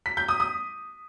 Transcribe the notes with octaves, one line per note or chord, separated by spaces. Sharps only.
B6
G6
D#6
D#6